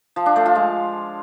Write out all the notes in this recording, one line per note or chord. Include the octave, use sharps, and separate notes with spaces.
F3
D4
A3
F4
G#3